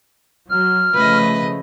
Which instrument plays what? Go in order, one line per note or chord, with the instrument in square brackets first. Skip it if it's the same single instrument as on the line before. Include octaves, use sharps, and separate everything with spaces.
[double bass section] F#3 [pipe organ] F6
[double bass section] C#3 F3 A3 [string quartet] B4 D#5